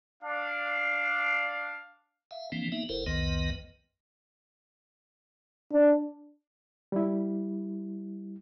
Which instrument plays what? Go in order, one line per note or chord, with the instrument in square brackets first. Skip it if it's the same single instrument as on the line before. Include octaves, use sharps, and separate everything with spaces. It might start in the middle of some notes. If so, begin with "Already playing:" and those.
[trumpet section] D4 F5
[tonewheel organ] E5 F5
E3 F3 A#3 C4 D4
A#3 B3 D#4 E5
F#1 E4 A4 A#4 C5
C2 F2 D#3 B3 B4 D#5
[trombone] D4
[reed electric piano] G3 E4